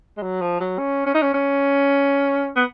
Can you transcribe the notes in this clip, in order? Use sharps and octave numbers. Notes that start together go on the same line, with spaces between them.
G#3
F#3
F3
F#3
C#4
C#4
D#4
C#4
C#4
B3